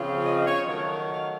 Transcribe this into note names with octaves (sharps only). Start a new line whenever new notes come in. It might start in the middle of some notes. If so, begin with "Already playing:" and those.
Already playing: C#3 F3 C4 F4
D#5
C#5
D#3 F#3 A3 A#4
F5